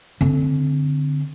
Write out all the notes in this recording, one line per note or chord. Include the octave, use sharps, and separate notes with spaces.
D3 C4